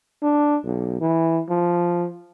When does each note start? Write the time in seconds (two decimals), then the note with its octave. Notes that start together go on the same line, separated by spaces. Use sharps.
0.22 D4
0.64 B1
1.01 E3
1.49 F3